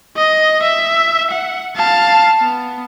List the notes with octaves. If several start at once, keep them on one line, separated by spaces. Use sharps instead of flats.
D#5
E5
F#5
F5 A5
B3